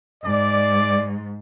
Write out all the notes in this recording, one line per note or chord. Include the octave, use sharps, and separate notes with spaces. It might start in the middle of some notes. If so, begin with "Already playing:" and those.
G#2 D5